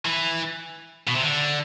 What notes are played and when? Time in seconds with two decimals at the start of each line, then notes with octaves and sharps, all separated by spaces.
0.05 E3
1.07 B2
1.15 C3
1.22 D3